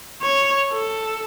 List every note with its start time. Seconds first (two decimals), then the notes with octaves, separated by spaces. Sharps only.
0.22 C#5
0.72 A4